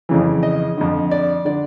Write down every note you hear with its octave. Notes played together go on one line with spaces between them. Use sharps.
F2 C#3 E3
D#5
F2 D3
D5
D3 D5